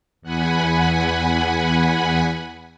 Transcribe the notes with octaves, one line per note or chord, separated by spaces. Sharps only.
E2 F#5 G#5 B5